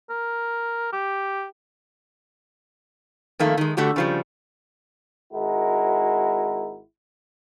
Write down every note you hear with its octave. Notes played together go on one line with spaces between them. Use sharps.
A#4
G4
F2 D#3 A3 A#3
D#3 G#3
D3 A3 F#4 G4
C#3 F3 G3
G#1 G#3 E4 F#4 A#4